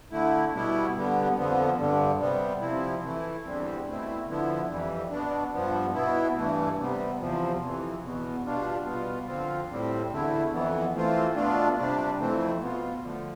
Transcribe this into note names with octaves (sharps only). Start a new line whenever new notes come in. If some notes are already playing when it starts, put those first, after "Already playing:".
D3 A3 E4
B2 G3 B3 E4
D3 G3 B3
F2 D3 F3 B3
G2 D3 G3
C3 G3 B3
C3 F3 C4 E4
E3 A3 E4
E2 D3 G3 C4
B2 A3 C4 E4
D3 F3 B3 E4
F2 E3 G3
B2 B3 D4
G2 F3 B3
B2 B3 E4
G2 E3 A3
C3 G3 B3
E2 C3 F3
F2 C3 E3
E2 B2 B3
B2 G3 D4 F4
B2 G3 B3 F4
D3 F3 C4 F4
A2 G3 C4
E2 D3 A3 E4
F2 E3 B3
E3 A3 C4 F4
B2 A3 D4 F4
C3 G3 D4
F2 E3 A3 C4
B2 B3 F4
D3 F3 A3